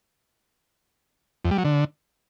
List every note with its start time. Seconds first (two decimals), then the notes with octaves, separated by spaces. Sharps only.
1.45 F2
1.51 G3
1.58 F#3
1.65 D3